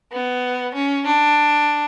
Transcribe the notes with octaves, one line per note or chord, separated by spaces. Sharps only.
B3
C#4
D4